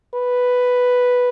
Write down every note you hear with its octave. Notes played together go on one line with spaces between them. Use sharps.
B4